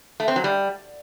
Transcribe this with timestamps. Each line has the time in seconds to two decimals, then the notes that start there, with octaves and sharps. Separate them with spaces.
0.20 A3
0.28 C4
0.36 F#3
0.44 G3